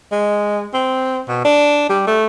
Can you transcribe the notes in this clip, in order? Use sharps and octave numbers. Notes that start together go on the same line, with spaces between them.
G#3
C4
B2
D4
G3
A3